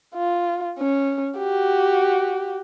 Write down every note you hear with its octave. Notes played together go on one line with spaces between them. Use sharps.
F4
C#4
F#4 G4